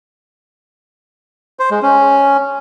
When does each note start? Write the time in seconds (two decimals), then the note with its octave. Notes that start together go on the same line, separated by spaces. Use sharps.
1.59 C5
1.71 G#3
1.82 C#4